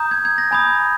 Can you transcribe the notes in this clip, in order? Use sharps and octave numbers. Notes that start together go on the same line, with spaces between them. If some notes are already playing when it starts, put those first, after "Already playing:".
Already playing: A#5 D#6 G6
G#6
G#6
A#6
G#5 B5 D#6 G6 G#6